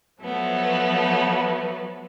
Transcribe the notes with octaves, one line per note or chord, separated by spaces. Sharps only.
F3 F#3 A3 B3